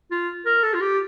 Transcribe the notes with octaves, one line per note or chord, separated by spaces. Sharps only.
F4
A#4
A4
F4
G4